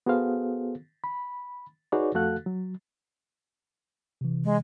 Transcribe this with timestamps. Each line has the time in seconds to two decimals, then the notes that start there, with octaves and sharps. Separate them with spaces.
0.06 B3 F#4 G#4 A4 C5 F5
1.04 B5
1.92 D#4 F#4 G#4 B4 C#5 D5
2.14 F2 A3 F#4 A4 F5 F#6
2.46 F#3
4.21 C3 E3
4.44 G#3